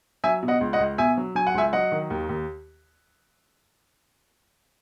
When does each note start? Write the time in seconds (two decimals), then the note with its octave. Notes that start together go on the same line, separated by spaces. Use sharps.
0.24 F#3 E5 G#5
0.43 B2
0.48 D#5 F#5
0.61 C#2
0.73 D#5 F#5
0.80 C#2
0.98 B2 E5 G#5
1.17 F#3
1.35 F#3 G#5
1.47 F#5
1.55 C#2 E5 G#5
1.73 F#3 D#5 F#5
1.92 D#3
2.10 D#2
2.29 D#2